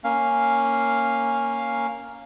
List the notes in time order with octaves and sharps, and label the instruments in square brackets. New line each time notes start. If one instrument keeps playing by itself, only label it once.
[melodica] A#3 C#4 F5